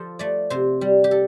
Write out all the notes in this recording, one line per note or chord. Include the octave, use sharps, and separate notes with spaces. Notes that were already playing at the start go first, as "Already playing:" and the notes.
Already playing: F3 A4 C5
A3 D5
C3 C5
G3
G4
A4